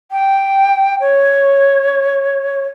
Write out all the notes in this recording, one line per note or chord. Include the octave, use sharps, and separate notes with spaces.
G5
C#5